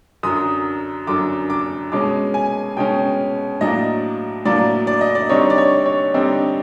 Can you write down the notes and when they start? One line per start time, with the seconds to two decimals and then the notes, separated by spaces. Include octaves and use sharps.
0.23 F#2 D3 F#3 D#6
1.07 F#2 D3 F#3 D6
1.50 D6
1.92 B2 G#3 C#4 D6
2.34 G#5
2.77 B2 G#3 C#4 G5
3.61 A2 F#3 A#3 D4 D#5
4.45 A2 F#3 A#3 D4 D5
4.87 D5
5.01 D#5
5.15 D5
5.29 D3 G3 C4 D#4 C#5
5.50 D5
5.58 C#5
5.86 C#5
6.14 D3 G3 C4 D#4